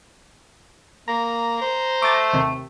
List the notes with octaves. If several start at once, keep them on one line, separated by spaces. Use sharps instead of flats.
A#3 A#5
C5
A3 D6 A6
D#2 C3